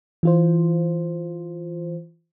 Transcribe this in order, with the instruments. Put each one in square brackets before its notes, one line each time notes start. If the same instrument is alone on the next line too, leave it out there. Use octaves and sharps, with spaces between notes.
[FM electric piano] E3 F4 C5